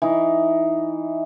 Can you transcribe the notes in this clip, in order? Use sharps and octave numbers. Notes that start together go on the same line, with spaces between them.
E3 D#4